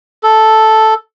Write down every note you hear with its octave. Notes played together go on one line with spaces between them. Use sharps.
A4